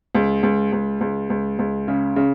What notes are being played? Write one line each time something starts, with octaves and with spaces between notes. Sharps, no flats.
C#2
C#2
C#2
C#2
C#2
C#2
C#3
C#3